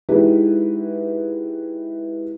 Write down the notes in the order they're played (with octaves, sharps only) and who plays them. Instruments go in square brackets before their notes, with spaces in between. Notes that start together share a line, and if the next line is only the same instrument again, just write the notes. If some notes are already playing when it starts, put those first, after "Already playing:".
[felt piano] G#3 D#4 E4 F#4 G4 B4